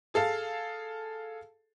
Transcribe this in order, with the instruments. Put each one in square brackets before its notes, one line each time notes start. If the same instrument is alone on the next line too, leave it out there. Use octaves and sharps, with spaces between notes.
[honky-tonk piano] G#4 A4 F5 A5